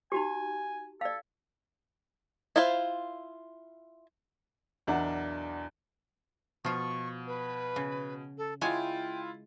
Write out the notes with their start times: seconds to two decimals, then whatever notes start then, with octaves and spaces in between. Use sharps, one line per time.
0.12 D#4 F#4 G4 G#5
1.01 A4 D5 F5
2.56 E4 F4 C5 F5
4.87 B1 E2 D4 A#4 E5 F#5
6.65 B2 F3 F4 C#6
7.27 B4
7.76 C#3
8.38 A4
8.61 G#3 E4 F4 C#5 G5 G#5